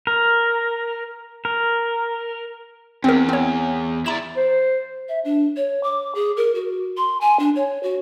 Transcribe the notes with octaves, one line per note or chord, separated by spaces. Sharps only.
A#4
A#4
E2 C4 A#4
C4 C#5
E4 D5 A#5 E7
C5
E5
D4
C#5
D6
G#4
A#4
F#4
C6
G#5
D4
C#5
F#4